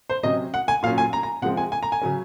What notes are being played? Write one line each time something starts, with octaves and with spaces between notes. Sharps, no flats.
C5
C3 F#3 C#4 D#5
F#5
G#5
A#2 F#3 C#4 F5
G#5
A#5
A#5
C3 F3 G#3 C4 F#5
G#5
G#5
A#5
G#5
C#3 F#3 C#4